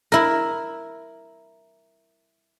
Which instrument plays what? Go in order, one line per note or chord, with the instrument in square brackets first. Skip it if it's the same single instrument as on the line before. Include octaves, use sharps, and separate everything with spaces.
[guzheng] E4 A#4